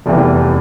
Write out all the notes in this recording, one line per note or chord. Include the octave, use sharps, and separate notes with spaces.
F1 E2 C3 E3 G3